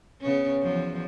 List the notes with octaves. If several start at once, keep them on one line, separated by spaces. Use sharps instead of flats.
C#3 B3 C#4
E2 F3 F#3